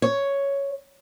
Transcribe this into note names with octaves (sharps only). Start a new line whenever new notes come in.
C#5